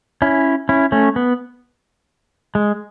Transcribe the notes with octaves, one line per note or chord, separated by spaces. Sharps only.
C#4 E4
C#4 E4
A3 C#4
B3
G#3